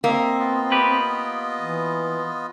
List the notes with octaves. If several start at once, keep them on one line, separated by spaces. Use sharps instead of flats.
A#3 C4 D#5 E5
B3 F4 D#5
G4 B4
E3